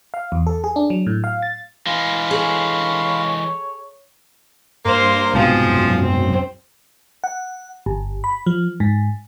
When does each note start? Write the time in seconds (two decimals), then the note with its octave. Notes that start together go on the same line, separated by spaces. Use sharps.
0.14 F5
0.32 E2
0.47 A4
0.64 G#4
0.76 D4
0.90 F#3
1.07 A2
1.24 F5
1.42 A6
1.87 E3 G#3 F5 B5 C6
2.31 G#4 A4 C#5
4.85 G2 A#3 C5 C6
5.34 C2 G#2 B2 F3 C4 G#4
5.66 F#2
6.00 C4
7.24 F#5
7.86 G1
8.24 B5
8.46 F3
8.80 G#2